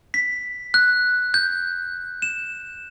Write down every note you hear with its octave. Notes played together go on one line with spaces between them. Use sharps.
B6
F#6
G6
E7